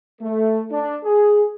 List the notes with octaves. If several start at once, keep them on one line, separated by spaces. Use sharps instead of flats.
A3
D4
G#4